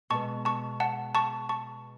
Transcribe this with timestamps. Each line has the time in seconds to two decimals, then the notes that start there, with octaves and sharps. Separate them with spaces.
0.10 B2 G#3 B3 A5 C#6
0.45 A5 C#6
0.80 F#5 A5
1.15 A5 C#6
1.49 A5 C#6